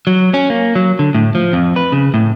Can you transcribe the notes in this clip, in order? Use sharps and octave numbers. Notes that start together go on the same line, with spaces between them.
F#3
C#4
A#3
F#3
D3
A2
F3
F2
B4
C#3
A2